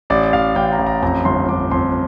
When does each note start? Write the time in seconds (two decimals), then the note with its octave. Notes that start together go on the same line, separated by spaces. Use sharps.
0.10 A1 D5
0.33 A1 F5
0.56 A1 G5
0.72 A#5
0.79 A1
0.87 A#5
1.02 F2 A#5
1.25 G1 C6
1.49 G1 D6
1.71 F2 C6